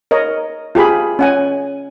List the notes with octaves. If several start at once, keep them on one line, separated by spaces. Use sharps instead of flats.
A#4 C#5 D#5
F4 G4 G#4 B5
C#4 F#5 G#5